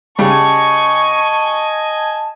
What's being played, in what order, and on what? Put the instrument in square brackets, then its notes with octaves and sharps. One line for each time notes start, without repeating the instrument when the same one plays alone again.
[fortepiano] C#3 G3 [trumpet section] D#5 G#5 [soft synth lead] A5 [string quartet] C#6